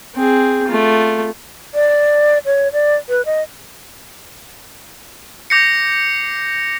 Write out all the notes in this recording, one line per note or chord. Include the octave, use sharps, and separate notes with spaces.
C4 G#4
A3 F4
D5
C#5
D5
B4
D#5
D6 G6 A#6 C7 C#7